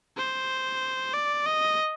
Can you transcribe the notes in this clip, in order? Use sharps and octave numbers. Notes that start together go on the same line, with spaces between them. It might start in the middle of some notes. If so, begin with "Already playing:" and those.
C5
D5
D#5